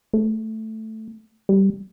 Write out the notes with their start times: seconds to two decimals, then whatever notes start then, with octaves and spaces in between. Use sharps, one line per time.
0.13 A3
1.49 G3